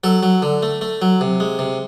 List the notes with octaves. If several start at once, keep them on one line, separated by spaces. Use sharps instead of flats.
F#3 A4
F#3
D3
A3
A3
F#3
C3
G#3
C3